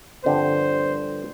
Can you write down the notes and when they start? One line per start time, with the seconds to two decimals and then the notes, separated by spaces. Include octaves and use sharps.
0.24 G1 G2 D3 F3 C4 C5